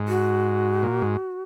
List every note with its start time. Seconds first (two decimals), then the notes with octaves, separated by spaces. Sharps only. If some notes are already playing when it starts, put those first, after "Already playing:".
Already playing: G#2
0.08 F#4
0.83 A#2
1.02 G#2